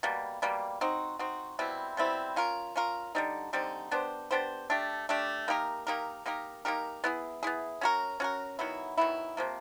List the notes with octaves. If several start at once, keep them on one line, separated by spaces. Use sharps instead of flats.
B2 G3 A#3
B2 G3 A#3
C4 D#4 F#4
C4 D#4 F#4
B2 G3 C4 E4
B2 G3 C4 E4
C#4 F4 A#4
C#4 F4 A#4
D3 G3 C4 D#4
D3 G3 C4 D#4
B3 D4 G4 C5
B3 D4 G4 C5
A3 D4 G4
A3 D4 G4
A#3 D#4 G4 A#4
A#3 D#4 G4 A#4
A#3 D#4 G4 A#4
A#3 D#4 G4 A#4
B3 E4 G#4
B3 E4 G#4
C#4 F#4 A#4
C#4 F#4 A#4
D#3 F#3 B3 E4
D#3 F#3 B3 E4
C3 F3 A#3